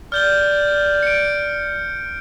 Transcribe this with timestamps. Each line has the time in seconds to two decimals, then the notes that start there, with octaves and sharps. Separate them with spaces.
0.12 D5 F6 G6 G7
1.03 C#7 D7